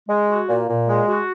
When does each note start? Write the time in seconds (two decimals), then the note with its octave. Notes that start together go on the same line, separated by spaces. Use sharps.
0.09 G#3
0.28 F#4
0.48 A#2
0.67 A#2
0.88 G#3
1.07 F#4